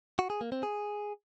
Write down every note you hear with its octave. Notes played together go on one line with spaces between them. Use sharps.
F#4
G#4
A#3
C4
G#4